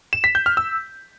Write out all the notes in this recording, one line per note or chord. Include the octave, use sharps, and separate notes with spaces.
E7
B6
G6
F6
E6